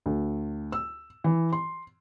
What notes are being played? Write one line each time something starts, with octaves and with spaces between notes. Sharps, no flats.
D2
E6
E3
C6